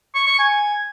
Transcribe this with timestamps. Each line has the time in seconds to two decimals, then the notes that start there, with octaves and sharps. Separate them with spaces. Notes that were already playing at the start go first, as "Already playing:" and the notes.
0.15 C#6
0.27 C#6
0.39 G#5